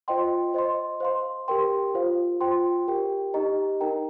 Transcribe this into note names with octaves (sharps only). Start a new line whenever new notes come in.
F4 C5 D#5 G5 C6
C5 D#5 C6
C5 F5 C6
G4 A#4 G5 C6
F4 C5 F5
F4 C5 G5 C6
G4 A#4 G5
D#4 G4 D#5 A#5
D#4 A#4 G5 A#5